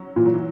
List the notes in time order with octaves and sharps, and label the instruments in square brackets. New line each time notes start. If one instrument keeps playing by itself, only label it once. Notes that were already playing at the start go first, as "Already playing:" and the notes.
Already playing: [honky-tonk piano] F#3 C#4
[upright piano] A#2 [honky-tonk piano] E3
[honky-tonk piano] F#3
E3